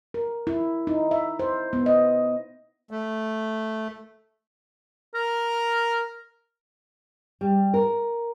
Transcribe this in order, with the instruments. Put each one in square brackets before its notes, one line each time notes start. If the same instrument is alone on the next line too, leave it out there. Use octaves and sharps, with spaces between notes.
[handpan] A#4
E4
D#4
E5
C5
B3
D#5
[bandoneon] A3
[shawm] A#4
[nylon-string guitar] G3
A#4